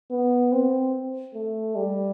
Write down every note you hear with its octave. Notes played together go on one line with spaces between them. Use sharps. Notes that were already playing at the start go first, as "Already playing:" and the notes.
B3
C4
A3
G3